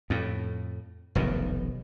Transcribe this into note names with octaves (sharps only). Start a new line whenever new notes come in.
F2 A2
F1 B1 F#2 D#3